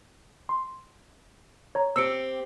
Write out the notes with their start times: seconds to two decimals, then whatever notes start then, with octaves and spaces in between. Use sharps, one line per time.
0.49 C6
1.75 C#5 A#5
1.96 C4 G4 E6 C#7 D7